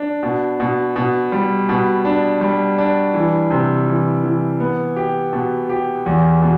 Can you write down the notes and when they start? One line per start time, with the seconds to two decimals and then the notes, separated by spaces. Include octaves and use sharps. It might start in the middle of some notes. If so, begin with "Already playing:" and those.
Already playing: D4
0.23 B2
0.60 B2
0.96 B2
1.32 G3
1.69 B2
2.05 D4
2.41 G3
2.78 D4
3.14 E3
3.50 C3
3.87 E3
4.23 E3
4.60 B3
4.96 G4
5.33 B2
5.69 G4
6.06 E2
6.42 B2